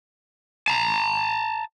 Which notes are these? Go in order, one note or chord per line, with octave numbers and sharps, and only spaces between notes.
A5 A#5